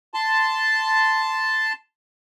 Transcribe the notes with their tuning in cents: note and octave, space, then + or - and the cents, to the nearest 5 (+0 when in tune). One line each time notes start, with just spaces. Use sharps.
A5 +0 C6 -15